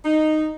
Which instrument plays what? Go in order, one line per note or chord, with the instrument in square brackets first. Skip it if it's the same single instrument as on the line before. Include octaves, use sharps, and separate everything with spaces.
[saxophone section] D#4